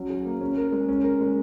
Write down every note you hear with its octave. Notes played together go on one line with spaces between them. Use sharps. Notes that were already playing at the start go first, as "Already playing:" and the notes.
Already playing: F#3 C#4
G#4
A#3
C#4
A#4
G#3
C#4
A#4
G#3